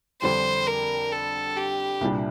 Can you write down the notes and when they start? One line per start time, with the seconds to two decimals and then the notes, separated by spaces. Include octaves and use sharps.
0.22 F2 D3 G3 D4 C5
0.67 A#4
1.12 A4
1.56 G4
2.01 C2 A#2 G3 D4